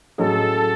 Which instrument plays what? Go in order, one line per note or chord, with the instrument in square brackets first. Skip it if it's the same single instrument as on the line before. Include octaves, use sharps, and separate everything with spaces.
[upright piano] A2 F#3 C#4 G#4 D#5 [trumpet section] A4